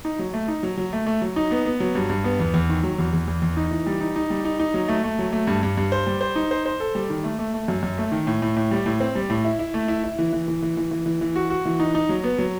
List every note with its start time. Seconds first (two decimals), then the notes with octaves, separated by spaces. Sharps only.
0.05 D#4
0.19 F#3
0.34 A3
0.48 D#4
0.63 F#3
0.77 F#3
0.93 A3
1.07 A3
1.22 F#3
1.36 D#4
1.51 B3
1.66 B3
1.80 F#3
1.95 G2
2.10 G2
2.24 B3
2.40 E2
2.54 E2
2.69 D#3
2.83 F#3
2.99 E2
3.13 E2
3.28 E2
3.42 E2
3.57 D#4
3.71 E3
3.86 G3
4.01 D#4
4.16 D#4
4.30 G3
4.45 D#4
4.60 D#4
4.74 F#3
4.88 A3
5.04 A3
5.19 F#3
5.33 A3
5.47 G2
5.63 G2
5.77 G2
5.92 C5
6.07 G3
6.21 C5
6.36 D#4
6.51 C5
6.66 C5
6.80 A4
6.95 G3
7.10 D#3
7.24 A3
7.39 A3
7.54 A3
7.68 F#2
7.83 F#2
7.98 A3
8.12 D#3
8.27 A2
8.42 A2
8.56 A2
8.71 G3
8.86 A2
9.00 C4
9.15 G3
9.30 A2
9.45 E4
9.59 E4
9.74 A3
9.88 E4
10.04 E4
10.19 E3
10.33 E3
10.48 E3
10.62 E3
10.77 E3
10.91 E3
11.06 E3
11.21 E3
11.36 F#4
11.50 F#4
11.66 E3
11.80 D#4
11.95 D#4
12.09 F#3
12.24 B3
12.39 F#3